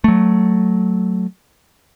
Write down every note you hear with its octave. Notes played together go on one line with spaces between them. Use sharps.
F#3 A3